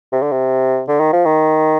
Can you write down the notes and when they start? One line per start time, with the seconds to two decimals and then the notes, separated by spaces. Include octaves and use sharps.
0.12 C3
0.22 D3
0.32 C3
0.88 D3
1.00 D#3
1.13 F3
1.25 D#3